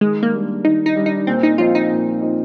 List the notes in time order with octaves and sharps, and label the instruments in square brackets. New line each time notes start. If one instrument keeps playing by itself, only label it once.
[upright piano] D#3 [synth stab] G#3
[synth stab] A#3
[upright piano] G3 D4
[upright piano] D#3 [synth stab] D#4
[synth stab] D#4
[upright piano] G3 D4
[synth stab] D#4
[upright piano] A#2 [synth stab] C4
[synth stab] D#4
[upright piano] F3 C4 D#4 [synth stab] F4
[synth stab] D#4
[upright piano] A#2
F3 C4 D#4